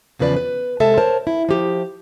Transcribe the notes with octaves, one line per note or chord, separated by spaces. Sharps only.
E2 C#3 F3 B4 D5
B4
C3 G#3 A4 E5 A5
A#4 C5 C#5 A5
E4
F3 G4